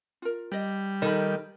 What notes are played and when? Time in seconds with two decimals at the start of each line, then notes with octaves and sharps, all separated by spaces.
0.22 F4 A#4
0.52 G3 D5 D#5
1.02 D#3 D#4 A4 B5